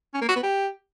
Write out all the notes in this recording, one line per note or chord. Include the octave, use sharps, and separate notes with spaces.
C#4
A#3
F#4
B3
G4